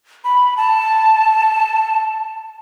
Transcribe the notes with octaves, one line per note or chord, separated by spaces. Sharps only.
B5
A5